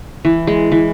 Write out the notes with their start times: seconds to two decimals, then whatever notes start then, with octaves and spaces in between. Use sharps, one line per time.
0.25 E3
0.47 G#3
0.72 E3